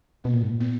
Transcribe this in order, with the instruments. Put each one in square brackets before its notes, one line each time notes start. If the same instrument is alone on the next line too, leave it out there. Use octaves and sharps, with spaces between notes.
[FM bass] B2 [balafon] A#3
[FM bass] A#2
G#2
A#2
[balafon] B3